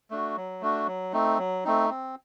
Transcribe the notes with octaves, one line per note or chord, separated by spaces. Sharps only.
A3 D4 F#4
F#3
A3 D4 F#4
F#3
A3 C4 D#4
F#3
A3 C4 D#4
C4